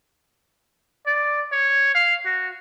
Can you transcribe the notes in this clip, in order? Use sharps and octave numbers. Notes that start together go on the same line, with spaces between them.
D5
C#5
F5
F#4